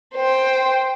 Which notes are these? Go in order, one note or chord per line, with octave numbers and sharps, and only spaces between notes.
C5 G5